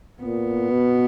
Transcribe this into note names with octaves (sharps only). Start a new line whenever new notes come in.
A#2 B3
B2